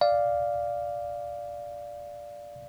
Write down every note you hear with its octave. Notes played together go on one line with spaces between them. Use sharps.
D5 F5